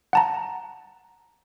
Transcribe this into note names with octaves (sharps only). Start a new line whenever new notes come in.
F#5 A5 A#5